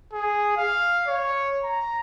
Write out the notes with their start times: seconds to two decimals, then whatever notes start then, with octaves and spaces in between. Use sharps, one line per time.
0.13 G#4
0.57 F5
1.07 C#5
1.63 A#5